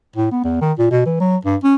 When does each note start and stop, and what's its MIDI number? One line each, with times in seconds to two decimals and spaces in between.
0.16 0.30 45
0.31 0.39 59
0.44 0.57 40
0.61 0.72 51
0.79 0.87 46
0.91 1.06 47
1.06 1.16 52
1.20 1.37 54
1.45 1.56 43
1.64 1.76 61